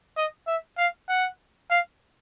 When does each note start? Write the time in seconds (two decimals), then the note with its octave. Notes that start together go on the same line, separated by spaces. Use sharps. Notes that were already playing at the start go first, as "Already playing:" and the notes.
0.17 D#5
0.47 E5
0.78 F5
1.09 F#5
1.71 F5